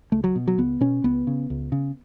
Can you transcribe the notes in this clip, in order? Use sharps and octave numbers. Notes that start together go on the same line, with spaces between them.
C#2 A3
F#3
B2
F#3
C#2 B3
B2 C#4
C#2 B3
C#3
C#2
C#3